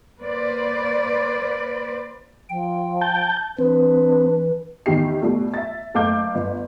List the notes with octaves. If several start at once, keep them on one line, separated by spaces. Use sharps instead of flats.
A#3 B4 C5 D5
F3 G5
A5 G6
E3 C4 D4 B4
E2 D#3 E4 G4 C7
B2 G3 A3
E5 A6
F#1 A3 F5 D6 G6
G1